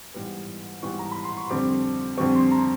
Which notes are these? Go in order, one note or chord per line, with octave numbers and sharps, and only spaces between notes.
G#2 E3 G3 B3
G#2 E3 G3 B3 C#6
A#5
B5
C6
C#6
F2 D3 G3 C4 D6
F2 D3 G3 C4 C#6
C6
A#5